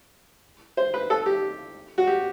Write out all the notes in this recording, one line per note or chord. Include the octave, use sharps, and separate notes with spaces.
C5
B4
A4
G4
F#4
G4